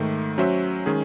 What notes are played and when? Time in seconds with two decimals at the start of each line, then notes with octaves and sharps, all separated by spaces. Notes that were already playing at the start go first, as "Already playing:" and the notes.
Already playing: G#2 D#3 A3
0.38 F#3 C#4 F#4 C5 E5
0.86 D#3 G#3 C#4 G#4